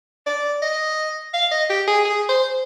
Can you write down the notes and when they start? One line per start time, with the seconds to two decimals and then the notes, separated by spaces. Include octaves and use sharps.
0.26 D5
0.62 D#5
1.34 F5
1.51 D#5
1.69 G4
1.87 G#4
2.05 G#4
2.29 C5